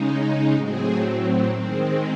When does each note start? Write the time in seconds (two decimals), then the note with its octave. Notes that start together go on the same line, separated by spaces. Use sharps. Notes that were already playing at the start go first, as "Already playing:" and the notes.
Already playing: C#3 G#3 D#4
0.53 A2 F#3 C4 G#4
1.50 D#3 G#3 C4